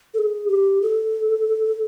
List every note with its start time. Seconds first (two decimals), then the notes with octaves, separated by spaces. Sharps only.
0.14 A4
0.19 G#4
0.48 G4
0.82 A4